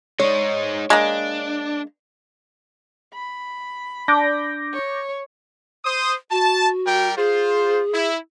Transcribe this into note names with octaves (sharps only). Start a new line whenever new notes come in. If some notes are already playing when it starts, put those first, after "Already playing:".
G#3 D#4 C#5
G#3 A#3 D4
B5
D4 D6 G6 A#6
C#5
C5 D#6
F#4 A5
G3 A#4 G5
F4 G#4 C5
E4